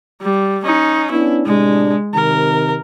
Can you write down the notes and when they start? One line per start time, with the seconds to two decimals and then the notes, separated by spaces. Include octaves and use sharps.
0.22 G3
0.64 C#4 D#4
1.11 B3 C#4 D4 E4
1.46 A2 C3 G#3 D4
2.14 C3 D#3 A#4